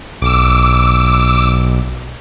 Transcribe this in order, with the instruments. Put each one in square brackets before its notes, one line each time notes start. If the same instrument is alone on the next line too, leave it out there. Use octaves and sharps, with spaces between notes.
[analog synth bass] B1 [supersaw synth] D6 E6